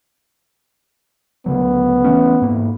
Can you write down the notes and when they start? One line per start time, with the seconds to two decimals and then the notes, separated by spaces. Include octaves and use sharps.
1.46 D2 C#3 F#3 B3
2.04 E3 A3 C#4
2.42 G#2 A#3